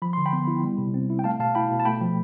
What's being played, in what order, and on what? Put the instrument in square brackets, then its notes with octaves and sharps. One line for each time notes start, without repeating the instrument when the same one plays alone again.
[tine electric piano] F3 B5
D3 C6
G5 B5
B3
E4
G3
C3
C4
E4
G5
A3 F5 A5
B2 F5 A5
E4 G5 B5
B2
A5
A3 G5 B5
F3